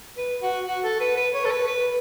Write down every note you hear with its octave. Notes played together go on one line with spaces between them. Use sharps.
B4
F#4
F#4
A4
B4
B4
C#5
A4
B4
B4